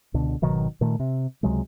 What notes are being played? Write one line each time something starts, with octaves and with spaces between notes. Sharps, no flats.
C#2 B2 D3
G#1 B2 D#3 F#3
A#2 D#3 A3
C3
C#2 C3 F#3 G#3